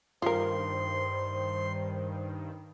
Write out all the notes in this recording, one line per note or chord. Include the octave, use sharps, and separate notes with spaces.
G2 D#3 F4 A#4 C5 C6